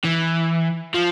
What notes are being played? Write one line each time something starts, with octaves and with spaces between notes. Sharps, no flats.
E3
F3